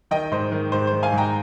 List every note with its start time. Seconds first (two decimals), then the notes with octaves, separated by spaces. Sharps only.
0.11 D#3 D#5 G5
0.32 G#2 C5 D#5
0.52 D#3
0.72 G#2 C5
0.87 D#3 C5
1.03 F5 G#5
1.12 G#2
1.18 G5 A#5